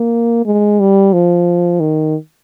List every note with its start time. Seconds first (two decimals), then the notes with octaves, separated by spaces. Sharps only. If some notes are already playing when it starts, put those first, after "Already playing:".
Already playing: A#3
0.46 G#3
0.80 G3
1.13 F3
1.80 D#3